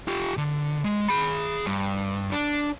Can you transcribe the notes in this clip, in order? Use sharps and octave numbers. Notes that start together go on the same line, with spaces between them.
F4 G4
D3
G#3
G#4 B5
G2
D4